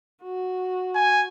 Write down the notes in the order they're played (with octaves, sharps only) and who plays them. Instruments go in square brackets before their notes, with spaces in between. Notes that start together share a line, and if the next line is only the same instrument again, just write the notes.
[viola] F#4
[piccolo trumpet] G#5